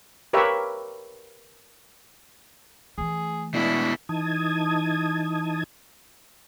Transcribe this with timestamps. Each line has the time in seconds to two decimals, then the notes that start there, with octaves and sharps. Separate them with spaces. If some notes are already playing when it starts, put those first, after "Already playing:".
0.33 G4 A#4 B4 C#5 E5 F5
2.98 E3 A3 G#4
3.54 B2 G#3 D4 E4
4.09 E3 D#4 A5 D#6 G#6